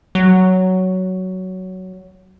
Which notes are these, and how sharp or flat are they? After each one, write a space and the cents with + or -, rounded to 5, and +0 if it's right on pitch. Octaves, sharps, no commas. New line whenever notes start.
F#3 +10